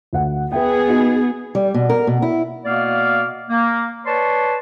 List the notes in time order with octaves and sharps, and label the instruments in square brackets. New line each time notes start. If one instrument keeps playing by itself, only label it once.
[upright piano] D2 F#5
[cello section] B3 G#4 [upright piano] B4 E5 G5
[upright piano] D#4 F#4
[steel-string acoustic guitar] G3
B2
A#4
B2
E4
[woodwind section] B2 A#3 B3 D5 F5 F6
A#3
B4 C#5 D5 A5 C6 C#6